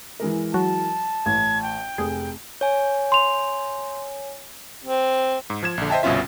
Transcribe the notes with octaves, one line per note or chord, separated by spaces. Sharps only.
E3 G#3 A#4
F#3 F#4 A5
A1 G#6
G5
F1 G#4
C#5 G#5
C6 F7
C4
G#2
F3 G#6 E7
A#1 D3
C5 D#5 E5 G5 A5
G1 C2 B2 C#4 F4 E5